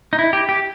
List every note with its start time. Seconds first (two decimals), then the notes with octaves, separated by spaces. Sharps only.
0.13 D#4
0.19 E4
0.33 G4
0.49 G4